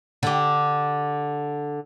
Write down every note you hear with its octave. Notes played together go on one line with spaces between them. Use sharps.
D3 G4